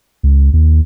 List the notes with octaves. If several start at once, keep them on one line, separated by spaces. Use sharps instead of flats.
C#2
D#2